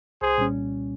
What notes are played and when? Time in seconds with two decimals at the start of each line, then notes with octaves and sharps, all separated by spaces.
0.21 C2 G#4 C5
0.38 A#2 G3 C#4